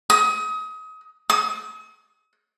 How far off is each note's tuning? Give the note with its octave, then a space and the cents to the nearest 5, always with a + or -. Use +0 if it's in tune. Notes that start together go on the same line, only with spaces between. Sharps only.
D#6 +30
D#6 +45